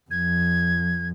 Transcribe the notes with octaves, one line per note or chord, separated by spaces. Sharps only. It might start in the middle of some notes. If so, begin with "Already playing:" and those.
F2 G#6